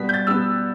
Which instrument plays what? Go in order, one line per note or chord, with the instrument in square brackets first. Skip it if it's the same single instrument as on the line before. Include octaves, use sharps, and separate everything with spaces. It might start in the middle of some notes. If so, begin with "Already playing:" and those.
Already playing: [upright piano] B2 G3 B3 B6
G6
A6
B2 G3 B3 E6